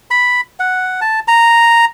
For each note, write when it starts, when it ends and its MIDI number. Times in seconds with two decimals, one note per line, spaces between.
0.11 0.41 83
0.60 1.00 78
1.01 1.20 81
1.28 1.85 82